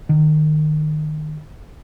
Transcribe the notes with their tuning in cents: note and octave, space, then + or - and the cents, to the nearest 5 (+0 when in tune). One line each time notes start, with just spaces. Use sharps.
D#3 -25